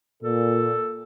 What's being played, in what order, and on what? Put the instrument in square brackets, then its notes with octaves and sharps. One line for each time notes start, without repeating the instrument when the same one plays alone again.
[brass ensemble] A#2 [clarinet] A4